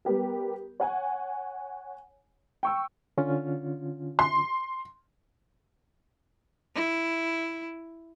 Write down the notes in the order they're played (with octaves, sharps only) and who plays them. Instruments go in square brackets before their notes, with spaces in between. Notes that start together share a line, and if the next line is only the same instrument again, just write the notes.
[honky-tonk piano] G3 B3 G4 A#4
C#5 F#5 G#5
G5 C#6 E6
[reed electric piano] D3 C#4 F4
[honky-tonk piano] C6
[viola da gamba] E4